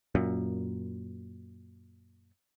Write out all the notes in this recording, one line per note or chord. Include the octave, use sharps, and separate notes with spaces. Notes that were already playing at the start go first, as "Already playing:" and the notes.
F#2 A#2